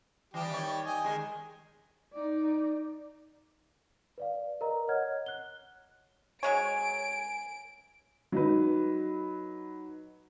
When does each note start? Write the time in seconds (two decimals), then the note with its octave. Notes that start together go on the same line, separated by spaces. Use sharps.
0.34 E3 G3 G4
0.50 D#3 C#5
0.86 D#5 G5 G#5
1.04 D#3 G#3
2.13 D#4 D5
4.18 B4 D5 F5
4.61 A#4 B4 D#5 A#5
4.88 C#5 D#5 F#5 F6 G#6
5.26 F#6 G7
6.43 F#3 G#3 C#5 G#5 D7
8.32 F#3 D#4 B4